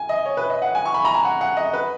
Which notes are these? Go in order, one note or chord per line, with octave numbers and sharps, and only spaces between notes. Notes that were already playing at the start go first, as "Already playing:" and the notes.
Already playing: G#5
D#5
C#5
B4
D#5
F#5
G#5
C#6
B5
A#5
G#5
F#5
F#5
D#5
B4